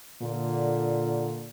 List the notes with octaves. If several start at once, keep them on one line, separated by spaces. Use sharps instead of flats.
A#2 D3